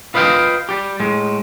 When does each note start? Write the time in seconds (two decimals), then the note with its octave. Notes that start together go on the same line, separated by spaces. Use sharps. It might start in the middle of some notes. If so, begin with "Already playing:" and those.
0.14 F4 B4 D#5 F5 G5
0.69 G3 G4
1.00 A2 G#3